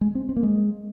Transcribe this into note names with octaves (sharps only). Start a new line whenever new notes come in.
G#3
C4
C4
A#3
G#3